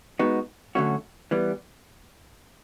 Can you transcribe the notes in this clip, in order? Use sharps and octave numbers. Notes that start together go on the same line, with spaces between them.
G#3 B3 D#4 F#4
D3 F#3 A3 C#4 F#4
E3 G3 B3